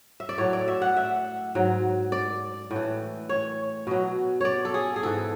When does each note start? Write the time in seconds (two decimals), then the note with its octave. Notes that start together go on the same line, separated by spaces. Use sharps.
0.20 E5
0.29 D5
0.38 A2 F#3 C#5
0.53 D5
0.68 E5
0.82 F#5
0.97 E5
1.55 G#2 F#3
2.12 D5
2.71 A2
2.76 E3
3.29 C#5
3.87 B2 F#3
4.41 C#5 D5
4.65 A4
4.74 G#4
4.96 G#4
5.03 G#2 E3 A4